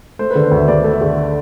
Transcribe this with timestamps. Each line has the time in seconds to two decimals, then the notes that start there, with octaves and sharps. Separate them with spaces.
0.19 A3 C5
0.31 D3 B4
0.44 C5
0.51 D2
0.56 E5
0.68 D2 D5
0.84 A3
0.93 E5
1.01 D3